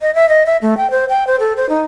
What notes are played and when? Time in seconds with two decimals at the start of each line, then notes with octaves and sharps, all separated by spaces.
0.01 D#5
0.15 E5
0.29 D#5
0.46 E5
0.62 A3
0.77 G5
0.91 C5
1.09 G5
1.27 C5
1.40 A4
1.57 C5
1.69 D#4